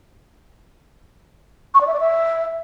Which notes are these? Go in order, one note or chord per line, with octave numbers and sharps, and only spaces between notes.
C#6
D5
E5
D5
E5